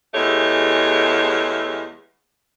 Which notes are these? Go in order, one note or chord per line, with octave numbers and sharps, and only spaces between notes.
E2 G#3 A3 G4 C#5